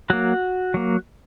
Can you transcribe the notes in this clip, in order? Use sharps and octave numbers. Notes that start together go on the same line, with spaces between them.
F#3 A#3 F#4
F#3 A#3